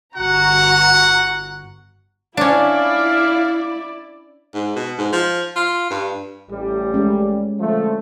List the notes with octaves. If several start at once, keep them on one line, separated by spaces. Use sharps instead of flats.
G1 F#4 F#5 A#5
C#4 D4 E4 D5 F5
G#2
B2
G#2
F3
F4
G2
A1 G3
G#3 C#4
D3 F3 A3